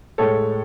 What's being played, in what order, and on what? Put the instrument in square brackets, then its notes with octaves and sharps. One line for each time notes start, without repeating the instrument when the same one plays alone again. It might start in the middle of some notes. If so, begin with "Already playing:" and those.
[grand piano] A2 G#3 A4 C#5